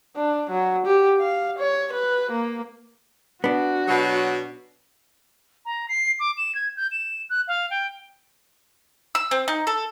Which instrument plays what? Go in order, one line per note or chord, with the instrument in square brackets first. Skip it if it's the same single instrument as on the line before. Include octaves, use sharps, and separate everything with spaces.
[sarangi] D4
F#3
G4
F5
C#5
B4
A#3
[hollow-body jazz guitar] B3 D4 [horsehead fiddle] F#4
[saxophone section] B2 F#3
[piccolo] A#5
C7
D6
E7
G#6
G6
E7
F#6
F5
G5
[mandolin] E6
C4
D#4
A4